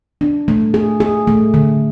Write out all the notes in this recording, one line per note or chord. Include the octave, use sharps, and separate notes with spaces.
D4
A3
G#4
G#4
A3
D3